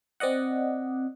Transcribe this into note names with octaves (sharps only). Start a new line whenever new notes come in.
C4 D5 D#5 F#5